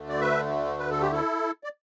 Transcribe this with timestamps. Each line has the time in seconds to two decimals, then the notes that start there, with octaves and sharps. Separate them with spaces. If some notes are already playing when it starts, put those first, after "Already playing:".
Already playing: D2 D3 A3
0.09 D5
0.20 B4 E5
0.79 B4
0.91 A4
1.01 G4
1.12 E4 A4
1.64 D5